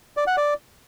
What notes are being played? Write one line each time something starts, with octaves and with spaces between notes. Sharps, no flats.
D5
F#5
D5